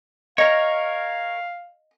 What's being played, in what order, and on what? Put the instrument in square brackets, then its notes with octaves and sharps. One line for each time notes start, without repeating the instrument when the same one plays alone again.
[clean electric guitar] A#4 C#5 [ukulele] D#5 [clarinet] F5